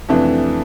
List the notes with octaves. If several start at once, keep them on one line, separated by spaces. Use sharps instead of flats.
F2 C3 E3 A3 D4